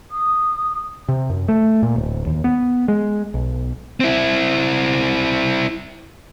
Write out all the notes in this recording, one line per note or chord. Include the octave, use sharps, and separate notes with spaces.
D#6
C3
F#2
A3
A#2
D1
D#2
B3
G#3
B1
C4 E4